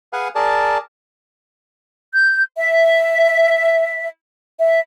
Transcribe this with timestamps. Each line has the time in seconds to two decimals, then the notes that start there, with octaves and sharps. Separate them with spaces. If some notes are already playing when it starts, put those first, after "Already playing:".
0.13 G#4 B4 F5 F#5 G#5
0.35 G#4 A#4 D5 A5
2.14 G6
2.58 E5
4.60 E5